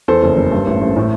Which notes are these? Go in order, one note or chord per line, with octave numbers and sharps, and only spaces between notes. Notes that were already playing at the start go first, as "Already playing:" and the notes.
E2 A4 C5
F#1
F#1
G2
A1
A1
A2